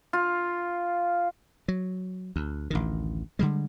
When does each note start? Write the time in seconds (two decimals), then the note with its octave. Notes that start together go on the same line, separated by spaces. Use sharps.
0.13 F4
1.68 F#3
2.36 D2
2.70 A1 D2 D#3
3.39 D3 G3 G#3